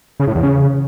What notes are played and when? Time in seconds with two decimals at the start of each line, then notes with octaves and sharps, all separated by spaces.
0.20 C#3
0.27 A2
0.35 E2
0.43 C#3